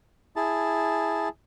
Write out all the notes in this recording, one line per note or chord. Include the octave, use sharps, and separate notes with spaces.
E4 G#4 A5